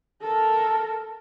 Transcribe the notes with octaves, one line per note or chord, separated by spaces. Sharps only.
A4 A#4